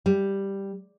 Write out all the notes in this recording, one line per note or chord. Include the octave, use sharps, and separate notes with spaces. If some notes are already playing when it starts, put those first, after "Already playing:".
G3